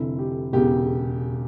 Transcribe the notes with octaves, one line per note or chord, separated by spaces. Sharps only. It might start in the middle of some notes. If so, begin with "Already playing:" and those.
Already playing: F1 F2 D3 E4
G4
E1 E2 C#3 G4